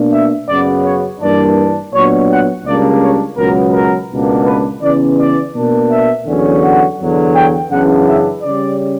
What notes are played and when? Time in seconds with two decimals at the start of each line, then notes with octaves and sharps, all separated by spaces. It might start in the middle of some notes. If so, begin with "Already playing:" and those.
Already playing: B2 A#3 D4
0.12 E5
0.48 F#2 C#3 F#3 B3 D5
0.84 C#5
1.20 G2 E3 A#3 D4 D5
1.93 A#2 F#3 B3 D4 C#5
2.28 F#5
2.64 C#2 C#3 G3 A#3 D4 D5
3.01 C#5
3.36 C#2 B2 F#3 B3 A#4
3.73 A#4
4.09 C#2 B2 A#3 D4
4.45 B4
4.81 C#3 E3 B3 D5
5.18 D5
5.53 B2 A#3 D4
5.90 E5
6.26 E2 D3 F#3 C#4
6.62 F#5
6.98 E2 D3 F#3
7.34 G5
7.70 F#2 C#3 E3 B3 D4 F#5
8.06 E5
8.42 C#3 G3 C#4 D5